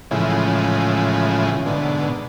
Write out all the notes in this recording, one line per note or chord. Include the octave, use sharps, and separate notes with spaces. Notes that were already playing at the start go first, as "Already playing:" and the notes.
A2 C#3 E3 F3 G#3
G#2 B2 D3